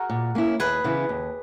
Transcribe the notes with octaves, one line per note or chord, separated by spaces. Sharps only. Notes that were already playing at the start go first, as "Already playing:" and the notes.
Already playing: F#4 G#4 A#4
A#2
A#3 C#4 E4
D#2 G#4 B4
C#3 E3 B3 E4
D#2